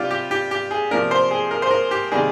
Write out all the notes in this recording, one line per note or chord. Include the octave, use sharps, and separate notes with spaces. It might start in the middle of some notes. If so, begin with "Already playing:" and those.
Already playing: C3 G3 D4 F4 G4
G4
G4
G4
G#4
C3 F3 A#3 D4 A#4
C5
G#4
A#4
C5
A#4
G4
C3 D#3 G3 A#3 D4 G#4